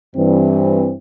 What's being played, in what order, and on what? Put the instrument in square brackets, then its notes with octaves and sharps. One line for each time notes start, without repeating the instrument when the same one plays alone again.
[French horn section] G2 E3 C4